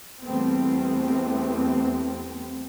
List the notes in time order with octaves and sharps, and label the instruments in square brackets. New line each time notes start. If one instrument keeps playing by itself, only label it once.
[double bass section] E2 G3 A3 B3 C4